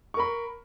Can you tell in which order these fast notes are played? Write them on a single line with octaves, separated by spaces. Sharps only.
C#6 A#4 B5